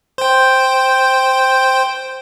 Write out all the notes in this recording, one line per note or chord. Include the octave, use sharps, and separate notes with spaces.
C5 G5